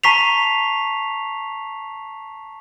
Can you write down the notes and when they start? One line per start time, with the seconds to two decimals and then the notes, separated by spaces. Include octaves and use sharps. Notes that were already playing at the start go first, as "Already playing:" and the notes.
0.04 A5 A#5 C#6 B6 C7 F7